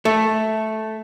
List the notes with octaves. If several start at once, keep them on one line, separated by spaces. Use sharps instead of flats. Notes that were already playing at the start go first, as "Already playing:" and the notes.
A3